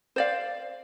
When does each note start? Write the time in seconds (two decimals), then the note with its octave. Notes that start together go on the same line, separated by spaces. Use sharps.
0.16 C5 D5 F5